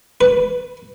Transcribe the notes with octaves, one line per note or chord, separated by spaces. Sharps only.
B4